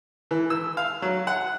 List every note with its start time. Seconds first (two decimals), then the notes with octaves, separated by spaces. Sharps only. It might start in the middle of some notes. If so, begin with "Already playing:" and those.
0.31 E3
0.50 E6
0.77 F5
1.02 F#3
1.27 F#5